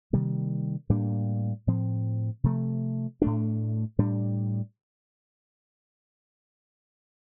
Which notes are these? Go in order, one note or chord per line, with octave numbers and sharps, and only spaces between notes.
C3 D#3 G3 A#3
A2 G3 A#3 D4
A2 F3 C4
C3 F3 A3
A2 A3 D4
A2 G3 D4